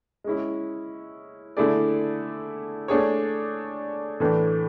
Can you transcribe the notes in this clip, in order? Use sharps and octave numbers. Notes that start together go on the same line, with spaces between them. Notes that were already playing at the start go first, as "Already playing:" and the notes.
G#3 C#4 E4
D3 A3 E4 G#4 D5
A3 D4 G#4 C#5
A2 E3 A3 D4